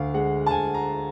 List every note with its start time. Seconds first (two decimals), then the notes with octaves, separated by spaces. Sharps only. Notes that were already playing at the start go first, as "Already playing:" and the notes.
Already playing: D2 F5
0.14 G#3 F#5
0.46 A5
0.50 D2 G#5
0.74 A#5